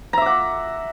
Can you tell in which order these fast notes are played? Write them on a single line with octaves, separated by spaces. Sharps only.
A#5 E5 D6 F#5